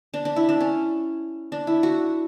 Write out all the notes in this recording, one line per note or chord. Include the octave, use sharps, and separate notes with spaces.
D4
D4
E4
D4
C#4
D4
E4
F#4